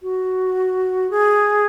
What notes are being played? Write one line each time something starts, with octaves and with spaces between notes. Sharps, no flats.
F#4
G#4